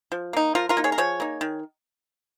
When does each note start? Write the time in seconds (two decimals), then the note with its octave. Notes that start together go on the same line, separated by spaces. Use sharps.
0.12 F3
0.33 A#3 D#4
0.55 F3 F4 A#4
0.69 F4 A#4
0.77 A#3 D#4
0.84 G#4 C#5
0.92 A#4
0.98 F3 G#4 C#5
1.20 A#3 D#4
1.41 D#3